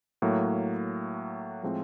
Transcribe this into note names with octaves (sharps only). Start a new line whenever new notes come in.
A2 F#3 A#3
A2 F3 G#3 C4